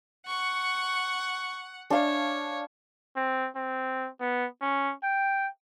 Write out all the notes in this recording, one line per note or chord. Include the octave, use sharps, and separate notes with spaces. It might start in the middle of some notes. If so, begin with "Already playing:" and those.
F#5 C#6
D4 C#5 F5 A5
C4
C4
B3
C#4
G5